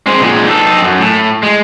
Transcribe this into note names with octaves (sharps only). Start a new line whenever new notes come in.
G#3 C4
A#2 G#3
D#4 A4
F#2
A2
G#3